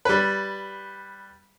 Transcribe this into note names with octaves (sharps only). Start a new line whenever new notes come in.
G3 B4